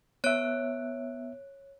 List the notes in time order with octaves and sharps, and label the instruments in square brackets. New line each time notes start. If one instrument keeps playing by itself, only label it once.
[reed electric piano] B3 E5 [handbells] C#5 F#6 D7